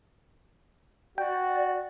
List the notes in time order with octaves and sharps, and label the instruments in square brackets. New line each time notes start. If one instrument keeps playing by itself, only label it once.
[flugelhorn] F#4 [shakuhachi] D5 [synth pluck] G5